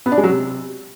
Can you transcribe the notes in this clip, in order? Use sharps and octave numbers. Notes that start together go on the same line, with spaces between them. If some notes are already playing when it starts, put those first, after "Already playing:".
B3
D4
G#3
F#3
C3